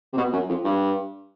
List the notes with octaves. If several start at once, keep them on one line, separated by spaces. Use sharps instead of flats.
C3
B2
F#2
F2
G2